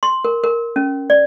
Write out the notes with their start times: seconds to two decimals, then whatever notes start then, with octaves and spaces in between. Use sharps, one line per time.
0.03 C6
0.25 A#4
0.44 A#4
0.76 C#4
1.10 D5